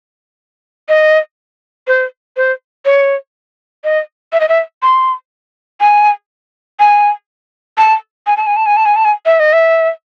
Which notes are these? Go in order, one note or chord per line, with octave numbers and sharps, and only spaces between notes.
D#5
C5
C5
C#5
D#5
E5
D#5
E5
C6
G#5
G#5
A5
G#5
A5
G#5
A5
G#5
A5
G#5
A5
G#5
E5
D#5
E5